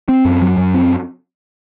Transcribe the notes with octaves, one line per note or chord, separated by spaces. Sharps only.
C4
F#2
F#3
F#2
C4